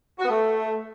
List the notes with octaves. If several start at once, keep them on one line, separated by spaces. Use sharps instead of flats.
F#4
B3
A3